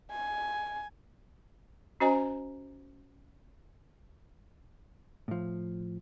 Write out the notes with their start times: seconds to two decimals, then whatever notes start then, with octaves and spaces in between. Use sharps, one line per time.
0.11 G#5
2.00 C#4 F#4 C5 D#5 G#5 A#5
5.28 A2 F3